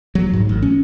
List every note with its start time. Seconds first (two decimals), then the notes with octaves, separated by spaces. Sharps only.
0.15 F#3
0.33 G#2
0.49 A1
0.62 C#4